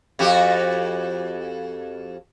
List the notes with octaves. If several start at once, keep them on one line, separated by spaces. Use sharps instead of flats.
F2 F#4 G4